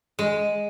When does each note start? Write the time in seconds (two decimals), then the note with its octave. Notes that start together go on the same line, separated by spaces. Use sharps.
0.19 G#3